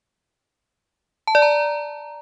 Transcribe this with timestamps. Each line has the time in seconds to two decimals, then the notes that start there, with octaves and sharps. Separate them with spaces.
1.27 A5
1.35 D5
1.42 A#5